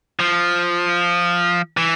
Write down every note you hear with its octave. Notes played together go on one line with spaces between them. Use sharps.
F3
E3